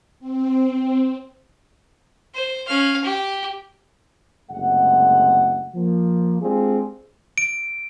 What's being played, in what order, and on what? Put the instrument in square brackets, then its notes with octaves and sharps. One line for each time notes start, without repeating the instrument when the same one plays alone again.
[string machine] C4
[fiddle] C5
C#4 F5
G4
[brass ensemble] F#1 C3 G#3 A3 F#5
F3 A#3
G#3 C4 D4 F4 G4 G#4
[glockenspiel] D7